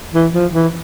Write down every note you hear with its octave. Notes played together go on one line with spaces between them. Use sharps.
E3
F3
E3